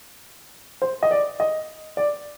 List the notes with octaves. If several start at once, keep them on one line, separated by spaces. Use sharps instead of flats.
C5
D#5
D5
D#5
D5